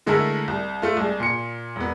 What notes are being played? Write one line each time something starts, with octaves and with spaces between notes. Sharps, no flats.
D3 G#3 A3 E4 A4 A#4
C2
A3 F4
C2 G#3
A#2 C#7
E1 B3